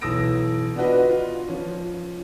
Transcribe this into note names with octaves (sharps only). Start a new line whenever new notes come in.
B1 E3 D#6 E6 A#6 D7
B3 D4 F4 F#4 B4 D#5
F4
F3 C#4